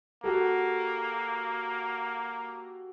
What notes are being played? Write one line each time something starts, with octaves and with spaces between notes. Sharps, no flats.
A#3 F#4 G4 A4